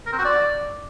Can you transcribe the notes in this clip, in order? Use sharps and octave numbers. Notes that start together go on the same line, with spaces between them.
A#4
C4
F#4
D5